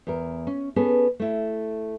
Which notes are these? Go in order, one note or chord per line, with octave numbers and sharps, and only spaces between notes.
E2 A#4
C#4
B3 C#4 G#4 A4
A3 E4